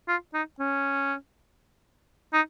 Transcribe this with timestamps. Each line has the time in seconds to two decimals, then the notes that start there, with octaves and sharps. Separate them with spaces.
0.08 F4
0.34 D#4
0.59 C#4
2.33 D#4